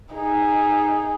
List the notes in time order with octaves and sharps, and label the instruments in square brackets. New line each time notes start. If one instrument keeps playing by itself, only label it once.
[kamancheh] D#4 G#4